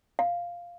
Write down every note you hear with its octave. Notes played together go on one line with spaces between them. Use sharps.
F5